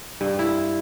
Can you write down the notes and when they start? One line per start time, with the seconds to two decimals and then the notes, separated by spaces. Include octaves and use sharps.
0.21 G2
0.39 E4